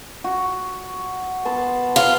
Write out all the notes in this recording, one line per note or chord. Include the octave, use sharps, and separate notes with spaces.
F#4
B3 A5 C6
F4